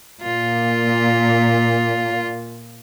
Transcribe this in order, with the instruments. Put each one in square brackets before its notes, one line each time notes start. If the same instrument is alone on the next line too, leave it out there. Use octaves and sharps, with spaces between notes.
[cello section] A#2 [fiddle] F4